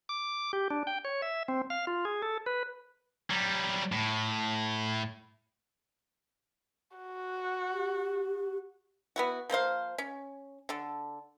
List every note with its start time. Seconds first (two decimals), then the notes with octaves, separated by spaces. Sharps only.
0.09 D6
0.53 G4
0.70 D4
0.87 G5
1.05 C#5
1.22 E5
1.48 C4
1.70 F5
1.87 F4
2.05 G#4
2.22 A4
2.46 B4
3.30 F#3 G3
3.92 A2
6.97 F#4
7.72 G4
9.16 B3 E4 F#4
9.50 F3 A#3 C5 F5
9.98 C#4
10.69 D3 A4